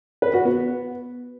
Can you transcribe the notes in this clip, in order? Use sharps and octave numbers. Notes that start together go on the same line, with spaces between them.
B4
F#4
B3